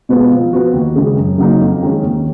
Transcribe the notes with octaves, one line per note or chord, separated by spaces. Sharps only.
B2 G#3 B3 F4
F3
B3 F#4
D#2
C#3 G#3
F#2
C#3 F#3 A#3 D#4
F2
D#3 G#3 C#4
D#2